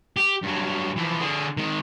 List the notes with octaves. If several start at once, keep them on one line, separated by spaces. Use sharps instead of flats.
G4
G2 F#3
E3 F3
D3 G#4
D#3 G#3